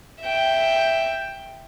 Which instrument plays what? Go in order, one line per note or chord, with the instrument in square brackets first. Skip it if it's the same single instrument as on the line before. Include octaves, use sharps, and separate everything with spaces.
[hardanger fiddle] E5 G5